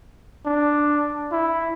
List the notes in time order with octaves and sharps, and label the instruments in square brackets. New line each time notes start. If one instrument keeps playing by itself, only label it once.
[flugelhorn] D4
E4